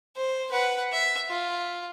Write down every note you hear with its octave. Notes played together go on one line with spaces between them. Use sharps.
C5
B4 F#5
E5
F4